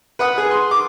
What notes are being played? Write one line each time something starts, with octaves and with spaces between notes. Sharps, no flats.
B4 F#5 D#6
G#4
C6
D6